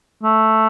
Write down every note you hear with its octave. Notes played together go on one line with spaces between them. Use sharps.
A3